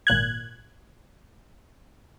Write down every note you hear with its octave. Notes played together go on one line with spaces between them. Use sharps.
G#1 A#2 F#6 G#6